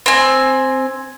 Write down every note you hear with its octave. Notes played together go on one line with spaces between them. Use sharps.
C4 G#5